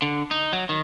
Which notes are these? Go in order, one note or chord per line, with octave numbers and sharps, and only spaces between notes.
D3
D#4
F#3
D#3